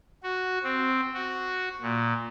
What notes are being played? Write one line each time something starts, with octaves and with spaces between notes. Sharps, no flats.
F#4
C4
F#4
A#2